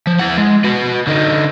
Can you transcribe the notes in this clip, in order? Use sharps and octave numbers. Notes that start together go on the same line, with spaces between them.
F3
E4 F#5
G#3
F#4 B4
D3 D#4